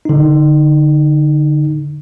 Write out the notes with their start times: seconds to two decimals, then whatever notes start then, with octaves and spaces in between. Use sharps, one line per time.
0.05 D3 D#4